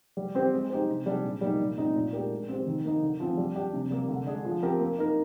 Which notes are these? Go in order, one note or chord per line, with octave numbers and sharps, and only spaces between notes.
G3
C4 G4 C5
G#3
D#4 G4 C5
C3
G3 D4 G#4
A#2
G3 A#3 D#4
A#2
G#3 C4 D#4
A#2
G#3 D4 G4 A#4
G#3
C4 G4 C5
D#3
A#3 D#4
D3
F3 C4
G3
D4 G4
C3
G3 A#3
D3
G#3 D4 G#4
F3
C4 G4 A#4
A#3
D#4 A#4